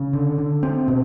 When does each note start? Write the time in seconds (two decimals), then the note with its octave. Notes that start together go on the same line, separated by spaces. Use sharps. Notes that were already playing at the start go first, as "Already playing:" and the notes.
Already playing: C#3
0.13 D3
0.38 D3
0.63 C4
0.88 B2